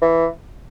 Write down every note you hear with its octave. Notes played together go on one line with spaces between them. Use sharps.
E3